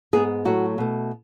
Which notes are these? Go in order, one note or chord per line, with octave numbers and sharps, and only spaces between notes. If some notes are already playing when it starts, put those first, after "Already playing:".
G#2 G#3 B3 G#4
A2 F#3 A3 F#4
B2 A3